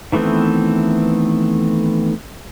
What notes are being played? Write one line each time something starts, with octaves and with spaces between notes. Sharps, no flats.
D#3 E3 A3 B3 C4